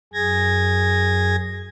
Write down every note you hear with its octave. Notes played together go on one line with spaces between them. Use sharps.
F#2 G#4 G#6 A#6